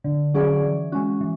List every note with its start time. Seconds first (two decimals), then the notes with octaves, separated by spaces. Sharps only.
0.04 D3
0.34 F#3 C#4 G#4 D5
0.63 E3
0.92 G#3 C#4 F#4
1.21 E3